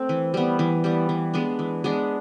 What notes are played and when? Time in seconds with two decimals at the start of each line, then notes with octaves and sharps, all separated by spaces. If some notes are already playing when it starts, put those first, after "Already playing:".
Already playing: A3 C4
0.09 E3
0.34 G3 B3
0.59 E3
0.84 G3 B3
1.09 E3
1.34 G#3 B3 D4
1.59 E3
1.84 G#3 B3 D4